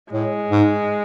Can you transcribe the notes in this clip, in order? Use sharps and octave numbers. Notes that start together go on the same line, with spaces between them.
A2 G#3
G#2